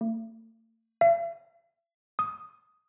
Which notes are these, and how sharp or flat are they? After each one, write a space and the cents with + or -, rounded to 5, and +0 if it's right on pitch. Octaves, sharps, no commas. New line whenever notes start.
A3 +40
E5 +45
D#6 +5